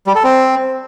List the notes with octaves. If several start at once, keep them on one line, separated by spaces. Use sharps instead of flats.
G3
A4
C4